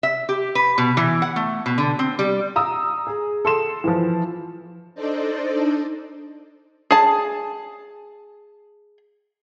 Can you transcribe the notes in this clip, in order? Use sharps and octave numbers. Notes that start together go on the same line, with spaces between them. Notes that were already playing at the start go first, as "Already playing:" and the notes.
E5
G4
B4
B2
E3
F#5
A3
B2
D3
C4
G3
A#5 D#6 E6
G#4
A4 C6 E7
E3 F3
D4 D#4 A4 C5 D5 D#5
G#4 A5